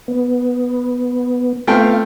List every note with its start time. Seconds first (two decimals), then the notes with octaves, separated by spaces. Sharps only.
0.08 B3
1.67 A3 B3 C4 F4 F5 G5